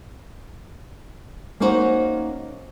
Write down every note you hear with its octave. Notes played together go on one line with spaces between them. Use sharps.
A#3 C#4 D#4 F#4 C5